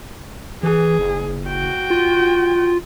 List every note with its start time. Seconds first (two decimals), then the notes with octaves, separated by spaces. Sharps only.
0.63 E3 G#4
0.99 F#1
1.48 F#4 G5
1.90 F4